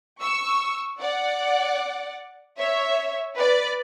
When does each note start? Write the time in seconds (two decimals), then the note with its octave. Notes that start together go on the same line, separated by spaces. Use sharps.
0.21 C#6 E6
1.00 D5 F#5
2.58 C#5 E5
3.36 B4 D5